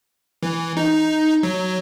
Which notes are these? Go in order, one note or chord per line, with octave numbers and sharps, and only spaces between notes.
E3
D#4
F#3